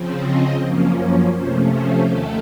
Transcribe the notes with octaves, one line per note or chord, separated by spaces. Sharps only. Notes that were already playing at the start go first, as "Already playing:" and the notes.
Already playing: C#3 F3 C4
D#5
F#2 F3 A#3 C#4
C#5
C3 F3 A3 C#4 C5
C5
D#2 D#3 A3 A4